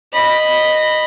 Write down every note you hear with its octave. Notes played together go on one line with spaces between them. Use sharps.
D#5 B5